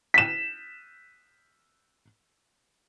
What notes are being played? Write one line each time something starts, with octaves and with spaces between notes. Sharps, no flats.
B6 E7